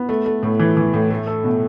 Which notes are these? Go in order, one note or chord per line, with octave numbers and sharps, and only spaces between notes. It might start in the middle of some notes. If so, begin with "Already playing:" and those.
Already playing: B3
A3
A3
A2
E3
E3
A2
A3
A4
B2